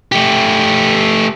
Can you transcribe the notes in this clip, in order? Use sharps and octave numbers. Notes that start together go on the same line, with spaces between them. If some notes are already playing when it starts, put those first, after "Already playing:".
A3 G4